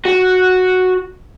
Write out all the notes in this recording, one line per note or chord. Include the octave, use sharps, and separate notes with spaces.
F#4